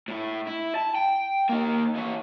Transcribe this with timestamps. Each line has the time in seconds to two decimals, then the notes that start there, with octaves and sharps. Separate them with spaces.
0.08 A2 E4
0.47 E4
0.75 A5
0.95 G5
1.49 A#3 D#4
1.96 E3 C#5